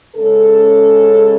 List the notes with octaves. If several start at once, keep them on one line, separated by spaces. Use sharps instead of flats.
C#3 G#3 C#4 A4